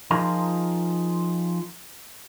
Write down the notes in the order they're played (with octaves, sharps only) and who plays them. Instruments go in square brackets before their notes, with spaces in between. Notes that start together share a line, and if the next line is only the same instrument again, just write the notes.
[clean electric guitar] F3 D#4 F4 G#4 A#4